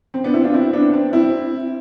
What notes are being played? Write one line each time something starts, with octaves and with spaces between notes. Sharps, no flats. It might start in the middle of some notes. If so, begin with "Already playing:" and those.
C4
B3 D4
C4 E4
D4 F4
C4 E4
B3 D4
C4
C4 E4